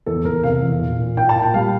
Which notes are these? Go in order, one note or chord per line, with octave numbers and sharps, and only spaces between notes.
E2 A4
E2 A#4
C3 F5
E2
A#2
A#2
A#2 G5
A5
A#2
G5
G3 F5